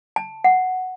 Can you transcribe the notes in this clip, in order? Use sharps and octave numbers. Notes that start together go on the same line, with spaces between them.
A5
F#5